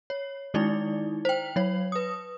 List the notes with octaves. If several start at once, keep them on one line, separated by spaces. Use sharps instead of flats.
C#5
D#3 G#3 D#4 E4 D5
C5 G5
F#3 C#5
B4 D#6